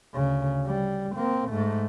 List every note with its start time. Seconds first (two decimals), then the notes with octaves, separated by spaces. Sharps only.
0.15 D2 C#3
0.66 G3
1.16 A#3 C4
1.49 G#2 A3